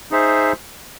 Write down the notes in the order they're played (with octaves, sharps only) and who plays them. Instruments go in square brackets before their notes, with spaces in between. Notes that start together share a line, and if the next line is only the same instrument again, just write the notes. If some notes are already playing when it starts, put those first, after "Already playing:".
[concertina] D#4 G#4 C5 E5